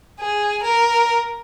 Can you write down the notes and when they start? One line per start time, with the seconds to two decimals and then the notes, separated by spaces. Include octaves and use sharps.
0.20 G#4
0.63 A#4